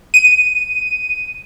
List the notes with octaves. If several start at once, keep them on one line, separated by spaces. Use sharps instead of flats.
D#7